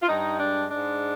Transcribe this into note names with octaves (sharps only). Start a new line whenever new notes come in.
F4
G2 D#4
G#3 D4
G#2 D4